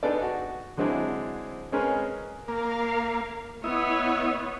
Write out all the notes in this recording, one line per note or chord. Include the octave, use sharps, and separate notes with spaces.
B3 D4 D#4 G#4 A4 D5
F#4
D3 F#3 G#3 C4 D4 E4
G#3 C4 C#4 G#4 A#4 B4
A#3 A#4 F5
B3 E4 C#5 D#5